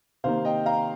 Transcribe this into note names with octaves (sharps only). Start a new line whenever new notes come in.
C3 D#3 A#3 C5 F5
D#5 G5
F5 A#5